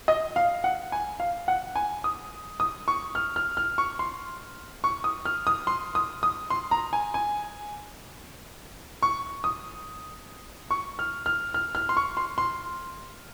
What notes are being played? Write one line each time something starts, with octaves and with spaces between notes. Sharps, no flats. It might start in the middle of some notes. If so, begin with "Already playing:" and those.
D#5
F5
F#5
G#5
F5
F#5
G#5
D#6
D#6
C#6
F6
F6
F6
C#6
C6
C#6
D#6
F6
D#6
C6
D#6
D#6
C6
A#5
G#5
G#5
C#6
D#6
C#6
F6
F6
F6
F6
C6
C#6
C6
C6